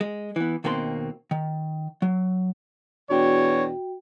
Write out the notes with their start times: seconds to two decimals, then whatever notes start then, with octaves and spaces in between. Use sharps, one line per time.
0.01 G#3
0.36 E3 B3
0.64 D#2 B2 D#3 A#3 C4 C6
1.31 D#3
2.02 F#3
3.10 E2 B2 D4 F#4 C#5 G5